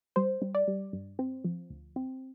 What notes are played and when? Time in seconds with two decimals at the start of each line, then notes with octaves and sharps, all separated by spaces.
0.16 G3 C5
0.42 G3
0.55 D5
0.68 G3
0.93 G2
1.19 C4
1.44 F3
1.70 D2
1.96 C4